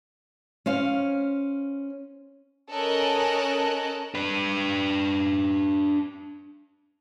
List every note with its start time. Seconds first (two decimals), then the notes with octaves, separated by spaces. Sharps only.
0.66 C#4 C5 F5
2.70 C#4 A4 A#4 D#5 F#6
4.15 D4 B4